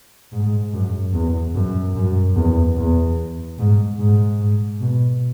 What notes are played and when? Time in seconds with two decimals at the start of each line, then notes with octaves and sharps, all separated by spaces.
0.32 G#2
0.74 F#2
1.14 E2
1.55 F#2
1.95 F#2
2.36 E2
2.77 E2
3.59 G#2
3.99 G#2
4.39 G#2
4.80 B2